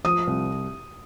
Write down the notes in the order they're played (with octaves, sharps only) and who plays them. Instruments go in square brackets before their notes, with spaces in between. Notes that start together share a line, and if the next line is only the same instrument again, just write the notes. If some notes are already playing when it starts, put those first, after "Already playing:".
[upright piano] F3 [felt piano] D#6
[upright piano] C2